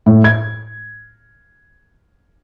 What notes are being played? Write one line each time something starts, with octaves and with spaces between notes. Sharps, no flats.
A2
G#6